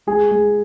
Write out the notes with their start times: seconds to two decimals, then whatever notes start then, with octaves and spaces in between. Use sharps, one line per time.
0.07 G#3 G#4
0.31 G#3